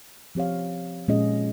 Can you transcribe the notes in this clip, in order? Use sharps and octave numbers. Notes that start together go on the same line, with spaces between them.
F3 C4 G4 C#5 F5
A#2 G#3 C#4 G#4 D#5